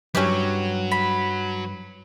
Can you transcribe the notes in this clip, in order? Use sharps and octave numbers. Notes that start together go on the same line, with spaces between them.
G2 F#3 C#4 E4 G4 B4
B5